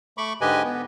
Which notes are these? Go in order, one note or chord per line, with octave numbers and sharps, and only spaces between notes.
A3 B5 C#6 D6
G#2 D3 G4 B4 D#5 G#5
B3